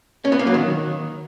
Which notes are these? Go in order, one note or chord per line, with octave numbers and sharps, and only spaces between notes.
C#4
B3
A#3
F#3
D#3